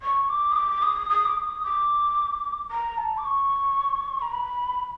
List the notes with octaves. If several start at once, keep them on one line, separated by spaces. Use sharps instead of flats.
C#6
D6
D#6
D6
D#6
D#6
D6
D#6
D6
A#5
A5
D6
C#6
A#5
B5